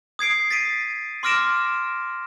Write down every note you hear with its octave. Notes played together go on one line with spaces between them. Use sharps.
D#6 G#6 C7 D7
A6 B6 D7 D#7
C6 D6 F6 A#6 D7 E7